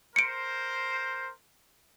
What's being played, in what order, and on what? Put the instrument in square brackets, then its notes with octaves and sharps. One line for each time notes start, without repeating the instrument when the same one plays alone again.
[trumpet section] A#4 C5 [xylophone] C#7 D7